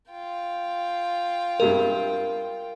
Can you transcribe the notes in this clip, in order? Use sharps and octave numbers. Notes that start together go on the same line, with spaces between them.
F4 G5
G2 C3 G#3 A#4